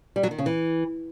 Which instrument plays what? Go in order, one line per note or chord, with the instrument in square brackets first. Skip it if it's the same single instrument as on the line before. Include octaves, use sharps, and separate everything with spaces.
[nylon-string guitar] G3
F#3
D#3
C#3
E3